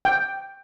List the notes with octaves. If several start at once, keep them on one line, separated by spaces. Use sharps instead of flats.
G5